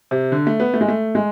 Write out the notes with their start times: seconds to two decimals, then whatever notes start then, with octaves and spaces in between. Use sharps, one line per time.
0.11 C3
0.32 D3
0.47 A3
0.60 B3
0.74 A3
0.81 G#3
0.88 A3
1.15 G#3